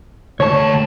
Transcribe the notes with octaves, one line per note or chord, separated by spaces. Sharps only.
D2 C#5 A5